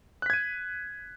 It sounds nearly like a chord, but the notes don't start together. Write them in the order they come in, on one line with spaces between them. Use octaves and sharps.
F#6 B6 G#6 D#7